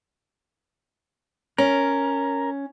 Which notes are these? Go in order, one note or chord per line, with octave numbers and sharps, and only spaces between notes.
C#4 A#4